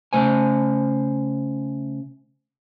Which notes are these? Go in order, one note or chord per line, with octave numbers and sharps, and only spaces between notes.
C#3 A3 C5 G#5